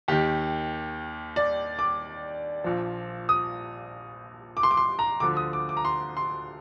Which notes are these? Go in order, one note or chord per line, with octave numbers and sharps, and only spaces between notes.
D#2 D#3 G4
D5
D6
A#1 A#2 F3
D#6
D6
C6
D6
C6
A#5
D2 D3 F3 D6
D#6
D6
D6
A#5
C6
C6